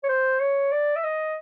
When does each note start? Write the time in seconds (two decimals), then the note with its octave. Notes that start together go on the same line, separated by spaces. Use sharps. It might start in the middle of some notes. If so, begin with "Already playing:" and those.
0.03 C#5
0.09 C5
0.40 C#5
0.72 D5
0.96 E5
1.04 D#5